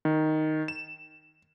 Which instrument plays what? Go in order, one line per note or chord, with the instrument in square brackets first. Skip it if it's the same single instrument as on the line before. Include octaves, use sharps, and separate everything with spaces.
[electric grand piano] D#3
E7